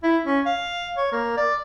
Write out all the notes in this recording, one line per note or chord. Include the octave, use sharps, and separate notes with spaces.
E4
C#4
F5
C#5
A#3
D5